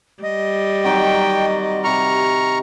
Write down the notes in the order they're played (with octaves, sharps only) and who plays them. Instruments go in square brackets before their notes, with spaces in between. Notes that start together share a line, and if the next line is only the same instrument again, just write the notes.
[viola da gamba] G3 [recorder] D#5
[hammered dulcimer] D#3 F#3 C4 [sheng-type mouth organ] G5
[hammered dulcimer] C3 B4 [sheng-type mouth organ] A#5 C#6 F6